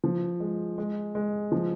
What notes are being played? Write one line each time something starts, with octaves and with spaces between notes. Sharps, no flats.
F3
G#3
G#3
G#3
F3